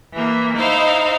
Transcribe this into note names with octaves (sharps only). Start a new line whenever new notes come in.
E3 A#3
D#4 E4 C5 F5